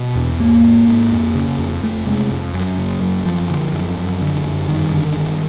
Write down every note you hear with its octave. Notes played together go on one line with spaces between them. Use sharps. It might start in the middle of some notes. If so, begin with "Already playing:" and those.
Already playing: B2
E2
G#2 A#3
G#2
G#2
F2
C#3
F2
F2 A3
C3 G#3
F2
F#2 F#3
C#3
F#2
F#2 F3
D3
F#2
F#2
D3
F#2
G2 D#3
D3
G2